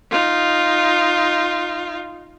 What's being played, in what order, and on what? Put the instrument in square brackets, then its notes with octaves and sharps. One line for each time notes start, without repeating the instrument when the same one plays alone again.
[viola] D#4 F4